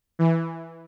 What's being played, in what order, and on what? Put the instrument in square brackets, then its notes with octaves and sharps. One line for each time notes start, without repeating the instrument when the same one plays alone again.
[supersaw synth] E3